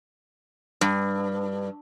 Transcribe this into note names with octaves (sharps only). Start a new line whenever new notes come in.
G2